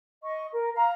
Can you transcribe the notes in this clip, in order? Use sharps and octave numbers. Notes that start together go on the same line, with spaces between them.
D#5 C#6
A#4
F5 A#5